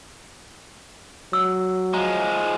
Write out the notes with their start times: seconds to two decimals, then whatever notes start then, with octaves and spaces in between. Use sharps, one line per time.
1.33 F#3 E6
1.94 F3 G#3 A#5